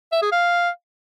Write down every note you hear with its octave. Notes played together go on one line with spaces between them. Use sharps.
E5
G#4
F5